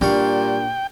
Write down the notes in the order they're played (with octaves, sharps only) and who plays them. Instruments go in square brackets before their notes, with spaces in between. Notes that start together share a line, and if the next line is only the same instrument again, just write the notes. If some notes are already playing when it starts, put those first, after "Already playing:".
[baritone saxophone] A#2 [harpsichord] G3 F5 C#6 [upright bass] D4 [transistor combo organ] G5